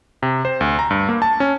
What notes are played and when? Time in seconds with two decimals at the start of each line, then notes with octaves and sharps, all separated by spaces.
0.23 C3
0.45 C5
0.61 D2
0.79 A#5
0.91 G2
1.09 A#3
1.22 A5
1.40 C#4